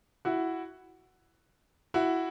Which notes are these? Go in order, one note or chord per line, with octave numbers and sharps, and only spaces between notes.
E4 F#4
E4 F#4